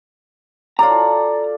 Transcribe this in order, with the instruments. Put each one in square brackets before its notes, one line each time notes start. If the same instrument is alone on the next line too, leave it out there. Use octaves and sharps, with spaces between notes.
[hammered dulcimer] F4 A4 D5 [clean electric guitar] A#5